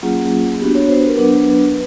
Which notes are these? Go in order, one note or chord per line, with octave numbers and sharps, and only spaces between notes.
F#3 A#3 C#4 F4 G#4
B3 D4 F#4 G4
C#5
C5
B4
A#4
F#3 B3 D4 B4